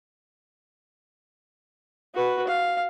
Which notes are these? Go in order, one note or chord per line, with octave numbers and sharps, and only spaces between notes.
F#4 B4
F5